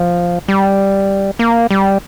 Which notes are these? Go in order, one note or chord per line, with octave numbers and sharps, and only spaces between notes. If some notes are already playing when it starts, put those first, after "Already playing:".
Already playing: F3
G3
A#3
G3